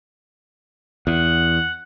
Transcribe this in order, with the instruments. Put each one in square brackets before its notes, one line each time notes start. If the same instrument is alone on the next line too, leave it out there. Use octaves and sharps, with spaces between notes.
[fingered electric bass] E2 [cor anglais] F#5